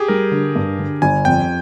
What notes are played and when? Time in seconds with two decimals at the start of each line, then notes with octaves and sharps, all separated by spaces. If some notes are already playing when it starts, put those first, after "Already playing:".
Already playing: G4 G#4
0.08 G3 A#4
0.32 D3
0.56 G2
0.78 D3
1.02 G1 G#5
1.25 F2 G5